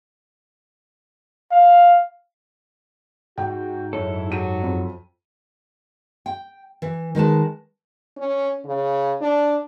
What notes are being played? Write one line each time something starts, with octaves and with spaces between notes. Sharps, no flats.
F5
G#2 F#4 G5
F#2 E4 A4 C#5
F#3 G4 D#7
F2
G5
E3
D#3 G#3 B4 A5
C#4
C#3
D4